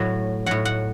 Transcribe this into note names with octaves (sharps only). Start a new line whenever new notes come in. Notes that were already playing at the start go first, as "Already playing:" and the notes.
Already playing: A2 F#3
A2 F#3 F#5
F#5